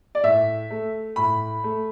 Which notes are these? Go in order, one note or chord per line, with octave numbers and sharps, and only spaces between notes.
D5
A2 E5
A3
A2 B5
A3